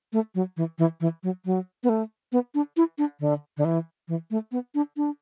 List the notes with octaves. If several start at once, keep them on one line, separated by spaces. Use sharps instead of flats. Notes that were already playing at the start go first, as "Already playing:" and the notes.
A3
F#3
E3
E3
E3
F#3
F#3
B3
A3
B3
D4
E4
D4
D3
D3
E3
E3
A3
B3
D4
D4